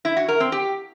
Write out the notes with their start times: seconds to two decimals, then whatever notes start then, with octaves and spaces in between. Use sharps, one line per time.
0.05 E4
0.17 F#4
0.28 A#4
0.40 C4
0.52 G4